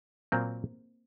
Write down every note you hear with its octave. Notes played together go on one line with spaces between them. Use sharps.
A#2 F#3 A#3 C4